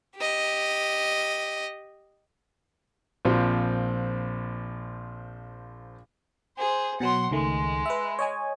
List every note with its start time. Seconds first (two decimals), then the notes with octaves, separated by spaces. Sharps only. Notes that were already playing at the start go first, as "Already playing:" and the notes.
0.16 G4 D#5
3.25 A#1 F3 C4
6.58 G#4 C5
7.00 B2 F#3 F#5 C6
7.31 C#2 D#3 G#3 A3
7.86 B4 E5
8.19 C#5 D#5 G#5